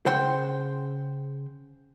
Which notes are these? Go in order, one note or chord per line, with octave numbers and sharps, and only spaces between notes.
C#3 C5 F#5 G5 C6